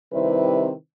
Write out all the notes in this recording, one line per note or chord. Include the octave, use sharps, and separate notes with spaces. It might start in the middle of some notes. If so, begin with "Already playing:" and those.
C3 D#3 G3 C4 E4 B4